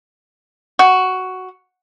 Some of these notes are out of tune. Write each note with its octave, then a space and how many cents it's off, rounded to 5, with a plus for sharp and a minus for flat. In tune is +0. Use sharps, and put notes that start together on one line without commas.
F#4 +5